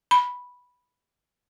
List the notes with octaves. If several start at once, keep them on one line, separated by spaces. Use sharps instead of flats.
B5